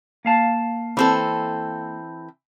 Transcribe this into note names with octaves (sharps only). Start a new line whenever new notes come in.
A#3 F5 A5
E3 C4 A4